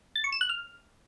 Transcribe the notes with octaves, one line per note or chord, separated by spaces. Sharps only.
A6
C#6
E7
F#6
F6